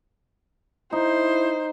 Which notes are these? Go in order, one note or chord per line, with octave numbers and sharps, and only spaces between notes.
D#4 E4 C5